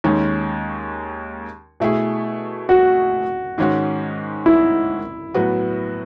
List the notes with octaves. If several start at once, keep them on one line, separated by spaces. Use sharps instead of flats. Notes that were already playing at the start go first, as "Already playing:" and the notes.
D#2 D#3 G#3 C#4
B2 A3 E4 G#4
F#4
G#2 D#3 G#3 C#4 F#4
E4
A2 F#3 B3 F#4